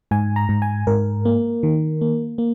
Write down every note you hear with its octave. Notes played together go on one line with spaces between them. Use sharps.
G#2 G#5
A#5
G#2
G#5
G#2 A#4
A#3
D#3
A#3
A#3